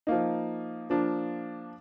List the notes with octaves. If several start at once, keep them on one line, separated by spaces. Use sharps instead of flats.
F3 A#3 D#4
F3 A#3 D4 F4